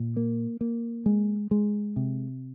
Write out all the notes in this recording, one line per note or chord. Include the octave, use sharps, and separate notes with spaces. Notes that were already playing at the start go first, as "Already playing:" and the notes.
Already playing: A#2
A#3
A#3
G#3
G#3
C3